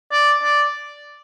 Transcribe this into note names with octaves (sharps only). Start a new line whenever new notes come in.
D5
D5